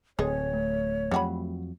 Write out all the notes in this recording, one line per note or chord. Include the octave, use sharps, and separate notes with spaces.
D1 G#3 C4 G#4 A4 C#5
A3
F2 F#3 G3 F#4 B5